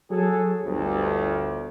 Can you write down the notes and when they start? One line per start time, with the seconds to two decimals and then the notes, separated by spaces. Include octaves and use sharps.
0.11 F#3 G#4 A4
0.65 G1 D2